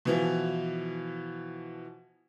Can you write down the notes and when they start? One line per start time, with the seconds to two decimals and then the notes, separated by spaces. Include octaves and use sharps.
0.05 B2 E3 F3